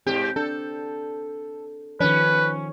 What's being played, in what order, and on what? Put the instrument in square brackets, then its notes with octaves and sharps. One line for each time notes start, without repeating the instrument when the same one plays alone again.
[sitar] G#2 G4 [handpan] C4
[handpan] D4 [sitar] A4
[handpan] D#3 F3 [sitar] C#4 [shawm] B4